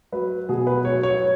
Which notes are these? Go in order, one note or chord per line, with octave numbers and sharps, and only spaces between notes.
F#3 B4
B2 G#4
B4
F#3 C#5
C#5